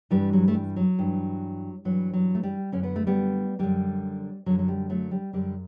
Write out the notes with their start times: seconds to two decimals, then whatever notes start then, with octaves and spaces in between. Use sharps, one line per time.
0.11 G2 E3 G3
0.33 F#3
0.48 A3
0.54 G3
0.76 F#3
0.99 G2 E3
1.85 G2 E3 F#3
2.14 F#3
2.35 A3
2.43 G3
2.72 F#2 D3 C#4
2.83 B3
2.96 A3
3.07 G3 B3
3.59 F#2 D3 G3
4.46 F#2 D3 F#3
4.59 F#3
4.68 G3
4.90 F#3 A3
5.11 G3
5.33 F#2 D3 G3